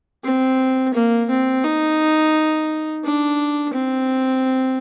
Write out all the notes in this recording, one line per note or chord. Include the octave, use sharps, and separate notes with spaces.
C4
A#3
C4
D#4
D4
C4